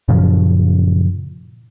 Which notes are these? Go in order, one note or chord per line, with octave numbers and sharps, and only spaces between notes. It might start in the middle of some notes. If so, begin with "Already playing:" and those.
F#2 A#2 C#3 F3